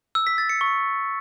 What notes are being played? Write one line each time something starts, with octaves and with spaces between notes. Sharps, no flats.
E6
B6
A6
C#7
C#6